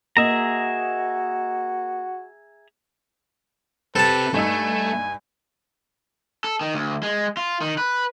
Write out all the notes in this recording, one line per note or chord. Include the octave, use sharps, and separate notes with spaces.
A#3 F#4 G#4 D#5 E5 A#5
C4 G4 A4 B4 A5
G2 A3 D#4 G#5 E6
A4
D#3
D2
G#3
F4
D#3
B4